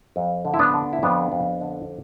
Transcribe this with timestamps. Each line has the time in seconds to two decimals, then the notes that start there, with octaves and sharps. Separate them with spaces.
0.16 F2
0.45 D3
0.54 E4
0.59 B3 D4
0.74 D3
0.93 E4
1.03 F2 B3 D4
1.32 F2
1.61 D3